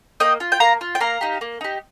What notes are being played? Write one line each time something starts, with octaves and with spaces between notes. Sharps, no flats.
A#3 D#5 G5
F4
G5
A#3 F5 A#5
F4
G5
A#3 F5 A#5
D#4 G4
A#3
D#4 G4